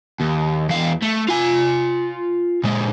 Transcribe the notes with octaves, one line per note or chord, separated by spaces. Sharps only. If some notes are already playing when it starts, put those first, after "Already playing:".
D#2
E2 F5
A3
F4 G#5
A#2 G#3